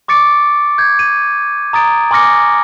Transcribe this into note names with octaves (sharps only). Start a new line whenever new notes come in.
C#6 D6 A6 C#7 D7
G6 G#6
D#7
A#5 D#6 A6 D7
G#5 C6 D6 F6 A#6 C#7